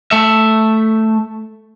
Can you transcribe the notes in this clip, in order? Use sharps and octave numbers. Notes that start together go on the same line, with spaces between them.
A3 E5